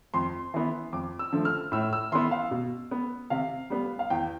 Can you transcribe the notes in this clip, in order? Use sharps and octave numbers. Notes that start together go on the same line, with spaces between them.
F2 C6
E3 B3
F2 D6
E6
D3 F3 A3
F6
A2 E6
E6
E3 B3 C6
F5
B2
B3
C3 F5
G3 B3
F5
E2 G5